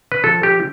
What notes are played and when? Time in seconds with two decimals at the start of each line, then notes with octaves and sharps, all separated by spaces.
0.12 B4
0.24 F3 A4
0.43 G4